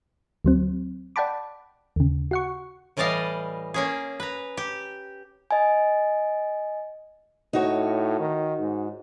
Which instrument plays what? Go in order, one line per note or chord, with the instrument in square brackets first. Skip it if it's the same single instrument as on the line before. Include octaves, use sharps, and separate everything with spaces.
[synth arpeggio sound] D2 F#3 C4
D5 F#5 G5 A5 B5 D6
D#2 C#3
F#4 F#5 C#6
[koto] A2 E3 G3 D5 D#5 F5
A#3 C#4 G#4
B4 A#5
G4
[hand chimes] D#5 G#5
[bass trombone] A2 [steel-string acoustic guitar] D#4 F#4 C#5
[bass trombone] D#3
G#2